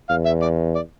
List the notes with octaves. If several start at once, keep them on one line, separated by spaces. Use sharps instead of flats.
E2 F5
E5
D5
D5